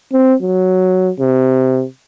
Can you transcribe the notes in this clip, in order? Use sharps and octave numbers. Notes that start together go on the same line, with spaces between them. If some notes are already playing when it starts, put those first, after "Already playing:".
C4
F#3
C3